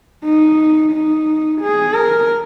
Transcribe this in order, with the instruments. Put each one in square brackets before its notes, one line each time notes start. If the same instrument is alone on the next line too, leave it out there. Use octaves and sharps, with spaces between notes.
[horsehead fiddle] D#4
D#4
G#4
A#4